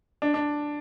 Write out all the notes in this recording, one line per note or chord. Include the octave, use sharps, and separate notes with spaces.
D4
D4